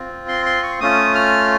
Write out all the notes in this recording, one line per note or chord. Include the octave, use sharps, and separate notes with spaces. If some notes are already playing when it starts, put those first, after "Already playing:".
Already playing: C4 F4
C6
C6
C#6
A3 C#4 F4 D#6
F6